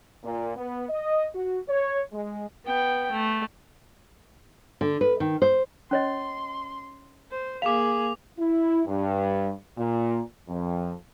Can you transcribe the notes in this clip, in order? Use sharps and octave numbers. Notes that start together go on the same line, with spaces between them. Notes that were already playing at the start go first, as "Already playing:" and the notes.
A#2
B3
D#5
F#4
C#5
G#3
B3 G5
A3
D3
B4
D#3
C5
C#4 C#5 D#5 C6
C5
A#3 G#4 F5 D6 F7
E4
G2
A#2
F2